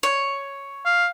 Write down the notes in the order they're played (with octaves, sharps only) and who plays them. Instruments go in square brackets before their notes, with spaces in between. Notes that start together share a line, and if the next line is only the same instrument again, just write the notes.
[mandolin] C#5
[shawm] F5